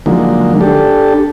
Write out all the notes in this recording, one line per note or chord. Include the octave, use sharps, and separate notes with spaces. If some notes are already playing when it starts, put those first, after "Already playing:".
D3 F3 F#3 G#3 A#3 D#4
D4 G4 A4